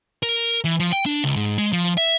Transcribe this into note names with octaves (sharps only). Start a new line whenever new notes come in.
A#4
E3
F3
G5
D4
C#2
G#2
G#3
F3
E5